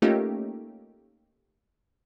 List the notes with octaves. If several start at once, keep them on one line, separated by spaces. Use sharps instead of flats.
A3 A#3 C#4 D#4 F4 G4